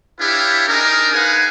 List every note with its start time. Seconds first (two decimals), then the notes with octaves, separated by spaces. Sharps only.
0.19 D4 E4 G4 B4 C#5 F5
0.68 D4 D#4 G#4 A#4
1.13 D#4 B4 F5 F#5 G#5